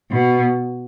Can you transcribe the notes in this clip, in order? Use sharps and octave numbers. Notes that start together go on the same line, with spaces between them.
B2